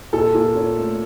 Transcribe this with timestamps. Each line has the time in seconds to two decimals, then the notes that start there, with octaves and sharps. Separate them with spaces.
0.13 A#2 A4
0.35 A#2
0.55 C#4
0.77 A3